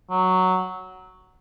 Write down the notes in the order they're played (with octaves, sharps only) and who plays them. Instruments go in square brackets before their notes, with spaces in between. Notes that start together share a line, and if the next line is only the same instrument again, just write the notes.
[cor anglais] F#3